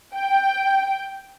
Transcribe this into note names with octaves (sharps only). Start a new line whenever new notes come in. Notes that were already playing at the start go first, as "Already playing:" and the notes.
G5